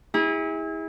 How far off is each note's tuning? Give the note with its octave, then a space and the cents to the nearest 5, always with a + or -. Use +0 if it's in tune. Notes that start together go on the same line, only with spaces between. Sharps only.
E4 -35 G#4 -35